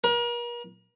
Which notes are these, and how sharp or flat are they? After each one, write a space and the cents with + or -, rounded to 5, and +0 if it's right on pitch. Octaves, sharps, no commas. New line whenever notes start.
A#4 +40